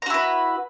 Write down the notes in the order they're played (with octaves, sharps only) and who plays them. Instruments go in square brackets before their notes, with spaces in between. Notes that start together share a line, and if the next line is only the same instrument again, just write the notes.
[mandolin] A#5
F#4
E4
B4